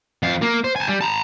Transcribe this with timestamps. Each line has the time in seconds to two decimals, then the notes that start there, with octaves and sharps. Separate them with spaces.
0.23 F2 F5
0.42 A#3
0.64 C5
0.76 G#5 A5
0.88 G3
1.01 A5 A#5